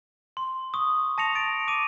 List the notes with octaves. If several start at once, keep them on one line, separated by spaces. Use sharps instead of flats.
C6
C#6 D#6
A5 A#6 C#7 F7
A6 D7
D6 D#7